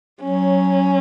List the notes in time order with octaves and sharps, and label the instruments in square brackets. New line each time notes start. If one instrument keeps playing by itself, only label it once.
[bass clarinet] F#3 [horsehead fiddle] C#4